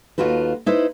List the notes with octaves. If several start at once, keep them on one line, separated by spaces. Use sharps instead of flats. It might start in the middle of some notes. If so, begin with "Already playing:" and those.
D#2 G#2 A3 F4 F#4 B4
D#4 E4 B4 C5